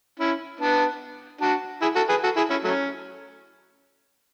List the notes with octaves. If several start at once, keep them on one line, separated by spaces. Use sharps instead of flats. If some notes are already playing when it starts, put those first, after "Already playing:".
C#4 E4
B3 D4
D4 F#4
E4 G#4
F#4 A4
G#4 B4
F#4 A4
E4 G#4
C#4 E4
F#3 A3 C#4